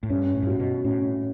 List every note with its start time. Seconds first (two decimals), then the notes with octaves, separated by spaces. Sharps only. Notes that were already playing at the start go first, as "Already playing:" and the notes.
0.03 A2
0.10 G2 C#4
0.35 A2
0.43 G2
0.47 A2 F#4
0.60 B2
0.84 A2 C#4